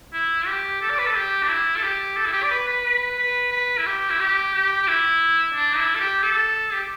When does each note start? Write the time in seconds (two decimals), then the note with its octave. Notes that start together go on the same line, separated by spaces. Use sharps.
0.13 E4
0.47 G4
0.82 A4
0.90 D5
0.99 B4
1.07 A4
1.16 G4
1.43 D4
1.49 E4
1.76 A4
1.83 G4
2.16 A4
2.26 E4
2.33 G4
2.43 D5
2.51 B4
2.67 B4
2.85 B4
3.18 B4
3.51 B4
3.78 E4
3.86 G4
4.10 E4
4.20 G4
4.54 G4
4.83 G4
4.88 E4
5.54 D4
5.78 E4
5.95 A4
6.00 G4
6.23 A4
6.73 G4